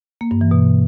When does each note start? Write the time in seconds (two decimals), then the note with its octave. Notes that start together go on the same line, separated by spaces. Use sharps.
0.21 A#3
0.31 G2
0.41 E3
0.51 B2